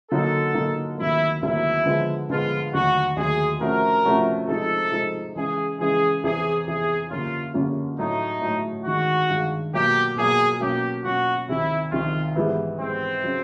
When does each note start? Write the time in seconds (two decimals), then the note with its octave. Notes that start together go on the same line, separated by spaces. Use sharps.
0.11 D3 F#3 A#3 D#4 A4
0.54 D3 F#3 A#3 D#4
0.98 D2 C3 D#3 F#3 A#3 E4
1.42 D2 C3 D#3 F#3 A#3 E4
1.86 D3 F3 G#3 B3
2.30 D3 F3 G#3 B3 F4
2.73 D#2 D3 F#3 A3 F#4
3.17 D#2 D3 F#3 A3 G#4
3.61 C3 F3 A3 C#4 F#4 A#4
4.05 C3 F3 A3 C#4 F#4
4.48 C3 F3 G#3 C4 D#4 A4
4.92 C3 F3 G#3 C4 D#4
5.36 C#3 E3 G#3 G#4
5.79 C#3 E3 G#3 G#4
6.23 E2 C3 E3 G#4
6.67 E2 C3 E3 G#4
7.10 F#2 D3 G3 A#3 C#4 F4
7.54 F#2 D3 G3 A#3 C#4
7.98 A2 F#3 A3 D#4
8.42 A2 F#3 A3
8.85 G2 D#3 G#3 F#4
9.29 G2 D#3 G#3
9.73 B2 F#3 A#3 G4
10.16 B2 F#3 A#3 G#4
10.60 B2 F#3 A#3 C#4 G4
11.04 B2 F#3 A#3 C#4 F#4
11.48 C2 C3 D#3 E4
11.91 C2 C3 D#3 F4
12.36 G#2 E3 G3 B3 E4
12.79 G#2 E3 G3 B3 C4 E4
13.23 C#3 F#3